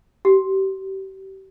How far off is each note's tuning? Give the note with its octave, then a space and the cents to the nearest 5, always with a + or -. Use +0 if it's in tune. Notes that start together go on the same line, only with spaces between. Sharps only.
G4 -35